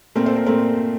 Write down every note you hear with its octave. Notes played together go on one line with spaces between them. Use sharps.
A#2 A3 C4 A#4
A4 C5
A#4
A#2 A3 C4 A#4